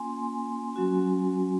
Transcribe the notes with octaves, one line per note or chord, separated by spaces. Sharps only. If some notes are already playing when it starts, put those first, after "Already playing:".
Already playing: A#3 C#4 F4 G#5 C6
F#3 C#4 F#4